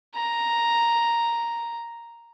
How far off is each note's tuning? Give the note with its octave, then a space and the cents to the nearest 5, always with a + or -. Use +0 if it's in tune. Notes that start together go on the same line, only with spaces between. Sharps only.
A#5 +0